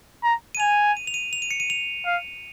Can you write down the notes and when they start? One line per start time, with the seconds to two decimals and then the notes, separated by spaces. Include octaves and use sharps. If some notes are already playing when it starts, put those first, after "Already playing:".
0.23 A#5
0.55 D#7
0.60 G#5 F7
0.97 D#7
1.07 F7
1.14 D#7
1.33 F7
1.42 D#7
1.51 C#7
1.60 D#7
1.70 F7
2.06 F5